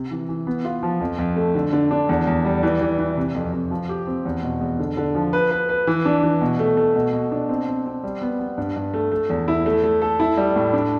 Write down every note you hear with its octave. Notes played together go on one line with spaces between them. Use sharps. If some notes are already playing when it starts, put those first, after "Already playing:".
Already playing: C3
E3
E3
B3
F4
F3
F2
F2
A3
D3
D3
D4
E2
E2
G3
E3
E3
E3
C3
F2
F2
F3
G4
C4
E2
B2
E2
D3
D3
F3
B4
B4
B4
E3
D4
E3
B2
A3
A3
B2
B2
D4
C4
C4
C4
G3
B3
B3
G2
G2
A3
A3
E2
E4
A3
A3
A4
E4
G3
A2
D4